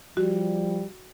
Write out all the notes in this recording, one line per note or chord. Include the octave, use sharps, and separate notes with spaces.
F3 G3 F#4